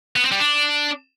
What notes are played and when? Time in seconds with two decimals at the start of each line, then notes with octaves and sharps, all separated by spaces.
0.16 B3
0.24 C4
0.32 G3
0.40 D4